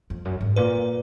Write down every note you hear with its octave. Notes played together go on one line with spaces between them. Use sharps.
F2
F#2
G#2
A#2 B4